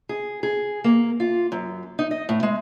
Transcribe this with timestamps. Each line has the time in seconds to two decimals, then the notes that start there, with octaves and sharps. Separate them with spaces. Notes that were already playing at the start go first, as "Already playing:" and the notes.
0.09 G#4
0.43 G#4
0.84 A#3
1.20 F4
1.52 F#2
1.99 D#4
2.11 D#5
2.29 A2
2.43 G#3